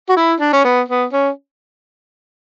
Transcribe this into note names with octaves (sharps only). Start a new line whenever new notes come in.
F#4
E4
D4
C#4
B3
B3
C#4